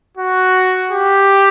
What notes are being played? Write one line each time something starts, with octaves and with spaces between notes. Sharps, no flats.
F#4
G4